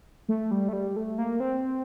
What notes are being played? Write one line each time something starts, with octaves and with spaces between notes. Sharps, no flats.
A3
G3
A3
G3
A3
A#3
C4